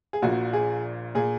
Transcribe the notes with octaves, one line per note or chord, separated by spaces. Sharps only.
G#4
A#1 A#2 F#4
G#4
A#2 G#4